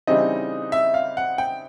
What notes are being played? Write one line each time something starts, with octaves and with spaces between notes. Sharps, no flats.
C#3 E3 G3 C4 D#4 D#5
E5
F5
F#5
G5